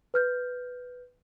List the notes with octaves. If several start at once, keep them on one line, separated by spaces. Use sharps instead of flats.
B4 F6 G6